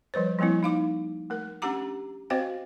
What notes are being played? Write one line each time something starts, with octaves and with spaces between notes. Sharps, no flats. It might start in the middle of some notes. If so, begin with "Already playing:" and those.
F3 G3 B4 C5
F3 G3 A#3 C4 E4
D#4 F5 D6
A3 A#4
C#4 D4 G4 F#5 A#5 D6
C4 F#4 C5 D#5 F5 G5